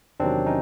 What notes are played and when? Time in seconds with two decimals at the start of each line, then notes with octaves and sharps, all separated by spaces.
0.20 E2 C3 D#3 F#3 C4 D4
0.46 C#4 D#4